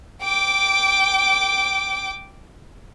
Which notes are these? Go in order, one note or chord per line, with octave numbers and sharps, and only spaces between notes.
G5 D6